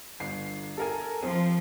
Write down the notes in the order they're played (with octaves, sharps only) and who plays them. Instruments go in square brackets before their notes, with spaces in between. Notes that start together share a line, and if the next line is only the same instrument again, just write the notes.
[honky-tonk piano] G1 C7
A4 A#4 G#5
[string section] F3 [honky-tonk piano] C4